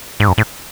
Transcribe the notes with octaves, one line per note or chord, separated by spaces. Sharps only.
G#2
F#2
A2